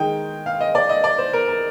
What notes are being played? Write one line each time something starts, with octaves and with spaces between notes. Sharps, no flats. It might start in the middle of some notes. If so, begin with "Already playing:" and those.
Already playing: D#3 G#3 D#4 G5
F5
D#5
D5
D#5
D5
C5
A#4
A#4